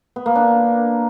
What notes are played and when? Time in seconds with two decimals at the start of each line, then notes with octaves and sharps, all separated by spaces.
0.16 B3
0.26 A#3
0.36 D4